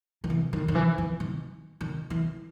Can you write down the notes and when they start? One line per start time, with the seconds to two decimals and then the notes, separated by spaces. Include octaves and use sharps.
0.24 D#3
0.30 E3
0.53 D#3
0.68 D#3
0.75 E3
0.98 E3
1.20 D#3
1.81 D#3
2.10 E3